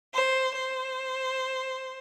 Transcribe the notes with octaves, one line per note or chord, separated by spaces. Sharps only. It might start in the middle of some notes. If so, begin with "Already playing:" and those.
C5
C5